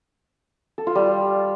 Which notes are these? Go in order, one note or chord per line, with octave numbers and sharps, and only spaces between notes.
A4
F4
G3